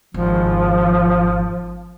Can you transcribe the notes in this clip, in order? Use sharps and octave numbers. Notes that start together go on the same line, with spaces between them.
G#1 F3